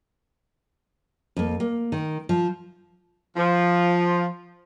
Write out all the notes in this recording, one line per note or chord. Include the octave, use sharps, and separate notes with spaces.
F2 A#3
A#3
D#3
F3
F3